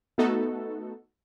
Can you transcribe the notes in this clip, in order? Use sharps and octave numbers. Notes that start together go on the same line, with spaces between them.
A3 B3 D#4 F#4 A4